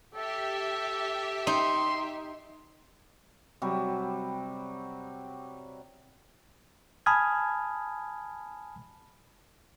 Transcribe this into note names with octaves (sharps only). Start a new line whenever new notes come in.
G4 A4 E5
D#4 C6
C3 F#3 G3
G#5 A5 B5 D#6 F6 G#6